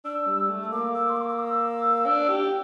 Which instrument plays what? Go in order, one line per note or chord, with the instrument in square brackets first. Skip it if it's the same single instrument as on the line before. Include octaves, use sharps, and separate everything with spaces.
[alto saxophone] D4 [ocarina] E6
[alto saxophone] G3
A3
[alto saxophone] A#3 [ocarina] D6
[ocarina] E6
C6
D6
D6
E6
[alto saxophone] D4
G4